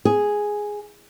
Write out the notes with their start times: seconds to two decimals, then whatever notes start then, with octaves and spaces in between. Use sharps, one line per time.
0.05 G#4